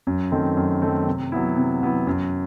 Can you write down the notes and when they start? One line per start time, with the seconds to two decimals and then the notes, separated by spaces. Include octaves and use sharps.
0.07 F#2
0.32 D#3 A3 C4
0.57 F#2
0.82 D#3 A3 C4
1.07 C3
1.32 F#3 B3 E4
1.56 C3
1.82 F#3 B3 E4
2.07 F#2